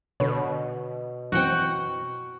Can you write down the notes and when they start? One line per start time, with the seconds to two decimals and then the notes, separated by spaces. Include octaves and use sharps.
0.20 B2 D3 B4 C#5
1.32 F#2 E3 C4 F#4 F#5 G5